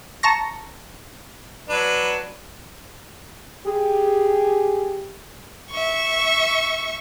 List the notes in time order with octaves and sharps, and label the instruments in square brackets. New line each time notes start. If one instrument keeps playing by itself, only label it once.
[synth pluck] A5 A#5 C#6 A#6
[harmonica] F#3 D4 B4
[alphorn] G4 [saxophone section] G#4
[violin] E5 C#6